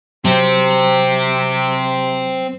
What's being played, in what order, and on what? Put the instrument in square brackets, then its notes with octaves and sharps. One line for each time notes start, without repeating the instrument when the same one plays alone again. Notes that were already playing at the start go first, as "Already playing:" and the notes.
[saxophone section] C3 [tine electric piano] F#3 [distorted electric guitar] C4